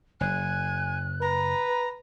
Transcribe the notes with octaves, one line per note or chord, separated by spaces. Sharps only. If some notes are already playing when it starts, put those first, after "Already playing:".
F#1 G#5 F#6
B4 A#5